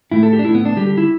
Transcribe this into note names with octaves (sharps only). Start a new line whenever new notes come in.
A2 A3 E4
A4
G4
D4
A2 A3 E4
B3
D4
D3 G3 G4
G4
E4